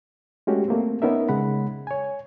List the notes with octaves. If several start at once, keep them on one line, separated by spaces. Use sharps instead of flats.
G#3 A3 C#4 F#4 G4
A3 A#3 C4
B3 C#4 D#4 A#4 E5
C#3 G#3 F#5 B5
C#5 G#5